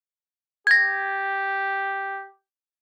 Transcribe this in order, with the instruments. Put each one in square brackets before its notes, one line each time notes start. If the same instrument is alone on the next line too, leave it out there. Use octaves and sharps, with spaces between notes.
[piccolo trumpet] G4 [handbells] G#6 A#6